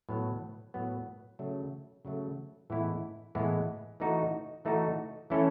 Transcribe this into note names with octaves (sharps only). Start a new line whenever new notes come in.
A2 F#3 B3
A2 F#3 B3
C#3 F#3 A3
C#3 F#3 A3
A2 E3 G#3 B3 E4
A2 E3 G#3 B3 E4
E3 A3 D#4 F#4
E3 A3 D#4 F#4
E3 A3 C#4 E4 A4